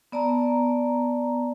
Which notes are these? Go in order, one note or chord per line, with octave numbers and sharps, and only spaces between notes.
B3 D5 A5 A#5